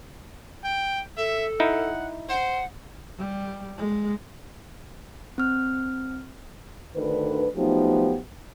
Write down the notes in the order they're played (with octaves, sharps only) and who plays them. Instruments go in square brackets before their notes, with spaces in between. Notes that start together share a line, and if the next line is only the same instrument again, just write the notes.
[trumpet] G5
[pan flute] A4 [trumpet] E5
[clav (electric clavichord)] D#4 E4 [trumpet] F#5
[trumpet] C5 [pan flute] F#5
[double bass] G3
G#3
[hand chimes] C4 F6
[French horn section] D2 D3 D#3 B4
F3 F#3 A3 B3 D#4 G4